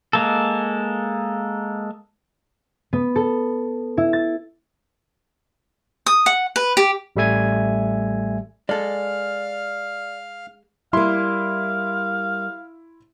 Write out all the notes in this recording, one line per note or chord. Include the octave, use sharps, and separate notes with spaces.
G#3 A#3 A4
B3
A4
E4
A6
D#6
F#5
B4
G4
A1 G3 A3 E5 G#5 G#6
G#3 A4 D5 F5 F6
G3 A#3 E4 F5 C6